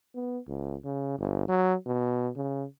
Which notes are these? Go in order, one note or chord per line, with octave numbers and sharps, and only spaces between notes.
B3
C#2
C#3
G1
F#3
B2
C#3